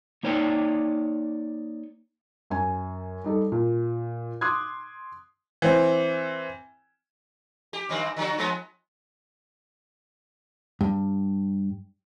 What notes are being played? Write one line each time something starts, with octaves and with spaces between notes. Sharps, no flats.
A#3 D#4 C#5 D5 G5
F#2 G#5
G3 D#4 A4
A#2
C6 D6 D#6 F#6 G#6
E3 C4
G4
G2 D#3 C4
D3 F#3 F#4
F3 G#3 B3
G2